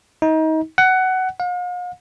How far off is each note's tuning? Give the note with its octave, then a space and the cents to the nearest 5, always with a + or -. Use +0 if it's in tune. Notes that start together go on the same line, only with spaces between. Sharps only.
D#4 +30
F#5 +15
F5 +45